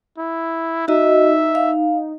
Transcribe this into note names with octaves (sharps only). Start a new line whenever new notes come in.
E4
D#4 F#4 D#5 E5
F5